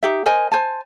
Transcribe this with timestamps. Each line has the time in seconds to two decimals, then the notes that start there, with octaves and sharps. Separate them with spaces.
0.03 D#4 G4 E5
0.26 A#4 C5 D#5 G#5
0.52 C5 G#5 A5